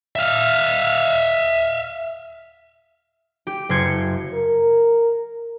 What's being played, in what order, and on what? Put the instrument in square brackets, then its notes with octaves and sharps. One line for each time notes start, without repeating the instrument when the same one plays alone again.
[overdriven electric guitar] E5 F5
[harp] G4
F#1 C6 G#6 C#7
[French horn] A#4